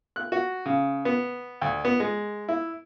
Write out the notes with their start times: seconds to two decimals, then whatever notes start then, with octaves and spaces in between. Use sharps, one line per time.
0.16 F#6
0.32 F#4
0.66 C#3
1.05 B3
1.61 D2
1.85 B3
2.00 G#3
2.49 E4